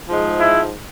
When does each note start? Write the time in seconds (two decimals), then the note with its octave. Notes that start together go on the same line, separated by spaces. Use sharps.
0.08 G#2 F3 G#3
0.40 E4